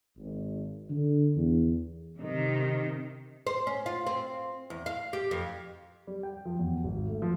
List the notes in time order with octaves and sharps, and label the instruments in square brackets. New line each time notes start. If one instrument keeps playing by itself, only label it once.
[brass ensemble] G#1
D3
E2
[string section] C3 D#3
[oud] C5
C#4
F4
C4
E2
F5
G4
F2
[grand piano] G3
G5
F3
E2
G#1
A3
F3